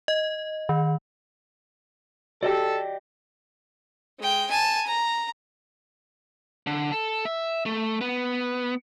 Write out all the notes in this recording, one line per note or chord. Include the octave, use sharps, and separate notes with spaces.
D#5
D#3
F#4 G4 A4 D5 D#5 G5
G#3 G5
G#5 A5
A#5
D3
A4
E5
A3
B3